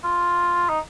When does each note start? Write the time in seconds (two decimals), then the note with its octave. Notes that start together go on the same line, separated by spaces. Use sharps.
0.04 F4
0.69 D#4